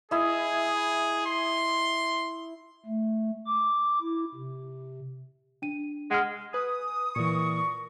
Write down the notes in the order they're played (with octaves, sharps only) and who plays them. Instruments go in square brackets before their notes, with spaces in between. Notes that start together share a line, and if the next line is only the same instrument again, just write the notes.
[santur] E4 D#5 [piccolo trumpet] G#4
[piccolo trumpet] C6
[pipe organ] A3
D6
E4
C3
[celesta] D4 D#7
[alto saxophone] G#3 [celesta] F#5 F6
[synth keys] B4 G#5 [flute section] D#6
[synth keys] A#2 E3 [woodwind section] A#4 D5 C#6